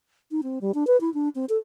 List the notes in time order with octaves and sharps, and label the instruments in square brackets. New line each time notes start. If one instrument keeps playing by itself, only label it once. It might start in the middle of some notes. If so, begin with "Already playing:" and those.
[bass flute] D#4
C4
G3
D4
B4
E4
D4
C4
A4